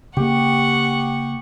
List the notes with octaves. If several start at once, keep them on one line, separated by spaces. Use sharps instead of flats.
C#3 A#3 G4 F#5 C#6